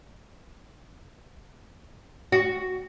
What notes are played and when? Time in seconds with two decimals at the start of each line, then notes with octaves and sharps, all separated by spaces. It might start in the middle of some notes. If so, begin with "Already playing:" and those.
2.32 F#4